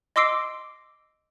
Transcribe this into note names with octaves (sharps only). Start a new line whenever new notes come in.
D#5 C6 D6 E6 C7 D7